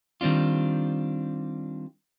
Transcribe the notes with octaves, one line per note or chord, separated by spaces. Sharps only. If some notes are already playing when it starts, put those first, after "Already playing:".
D#3 G3 C4 D4 F4